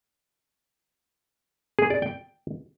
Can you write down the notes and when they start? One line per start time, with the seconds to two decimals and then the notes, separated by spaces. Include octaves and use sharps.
1.79 G#4
1.90 D5
2.02 G5